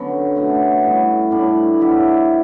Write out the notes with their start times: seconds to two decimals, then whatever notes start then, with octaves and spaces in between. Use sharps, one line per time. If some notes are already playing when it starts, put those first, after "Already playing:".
Already playing: D3 F#3 B3 C#4
0.36 B2 A3 C#4 F#4
0.84 A2 G3 B3
1.31 A2 G3 B3 D4
1.80 F#3 B3 E4 G4